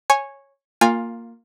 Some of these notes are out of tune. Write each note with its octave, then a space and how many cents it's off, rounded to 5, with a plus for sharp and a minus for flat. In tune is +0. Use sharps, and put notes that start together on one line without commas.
C#5 -10 G#5 +0
A#3 -10 F4 +10 G#5 -25